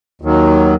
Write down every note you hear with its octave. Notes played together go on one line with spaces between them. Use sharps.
D#2 D#3 F#3